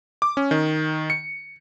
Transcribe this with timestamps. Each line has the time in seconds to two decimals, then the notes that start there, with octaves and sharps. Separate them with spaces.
0.22 D6
0.37 C#4
0.51 D#3
1.10 C#7